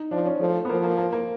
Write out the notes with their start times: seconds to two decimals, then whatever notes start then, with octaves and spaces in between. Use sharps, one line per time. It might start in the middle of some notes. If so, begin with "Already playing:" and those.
Already playing: D#4
0.11 F3 D4
0.26 C#4
0.40 F3 A3
0.65 B3
0.69 F3 A#3
0.84 A#3
0.98 A#3
1.13 A#3